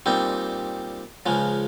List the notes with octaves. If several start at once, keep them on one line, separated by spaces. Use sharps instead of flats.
A#2 G3 C4 D#4
C#2 C#3 F3 G#3